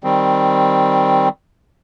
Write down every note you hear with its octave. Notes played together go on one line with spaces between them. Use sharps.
D#3 G3 C4